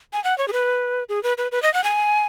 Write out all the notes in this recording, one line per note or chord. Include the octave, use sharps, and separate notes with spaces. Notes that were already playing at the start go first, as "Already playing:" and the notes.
G#5
F#5
C#5
G#4
B4
G#4
B4
B4
B4
D#5
F#5
G#5